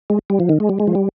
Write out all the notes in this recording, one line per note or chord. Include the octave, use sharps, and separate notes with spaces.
G#3
G3
F3
D#3
G#3
G3
G#3
F3
G3